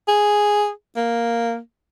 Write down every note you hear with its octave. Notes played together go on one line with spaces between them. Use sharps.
G#4
A#3